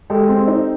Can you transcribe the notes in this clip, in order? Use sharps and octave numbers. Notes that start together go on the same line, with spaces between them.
G#3 G4 A4
C4
D#4